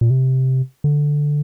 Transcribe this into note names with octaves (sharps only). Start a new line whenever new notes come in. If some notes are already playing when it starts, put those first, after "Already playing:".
A#2
C3
D3